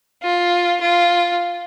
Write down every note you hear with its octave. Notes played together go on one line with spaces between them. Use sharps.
F4
F4